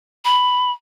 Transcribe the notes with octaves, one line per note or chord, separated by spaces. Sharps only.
B5